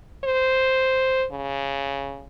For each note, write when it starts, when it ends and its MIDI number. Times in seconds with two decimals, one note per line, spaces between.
0.24 1.26 72
1.31 2.25 49